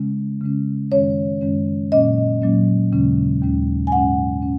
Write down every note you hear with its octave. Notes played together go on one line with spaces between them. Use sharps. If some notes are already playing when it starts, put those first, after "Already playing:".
Already playing: C#3 G#3 C#4
C#3 G#3 C#4
F#2 D#3 G#3 C#4 C#5
F#2 D#3 G#3 C#4
A#2 F#3 A#3 C#4 D#5
A#2 F#3 A#3 C#4
D#2 C#3 G#3 C#4
D#2 C#3 G#3 C#4
G#5
G#2 G#3 C#4 F#5
C#4